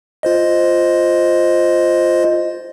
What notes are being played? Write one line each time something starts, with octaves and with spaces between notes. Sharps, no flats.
F4 C5 D#5